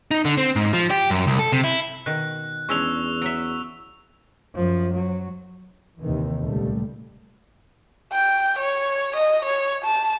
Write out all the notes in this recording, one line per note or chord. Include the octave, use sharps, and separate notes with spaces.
D#4
D3
C4
G#2
F3
G4
F#2
C2
A4
C3
E4
B2 D#3 F#6
E2 G#3 C#4 D4 C#6 E6 F7
F#3 E5
F#2 F3
F#3
D#2 C3 D#3 E3
C#2 A#2 G3 A3
G5
C#5
D#5
C#5
A5